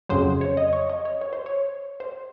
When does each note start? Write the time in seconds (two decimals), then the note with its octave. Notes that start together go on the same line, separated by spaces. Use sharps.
0.09 F2 C#3 F#3 C5
0.41 C#5
0.57 D#5
0.73 C#5
0.90 D#5
1.05 C#5
1.21 C#5
1.33 C5
1.46 C#5
2.00 C5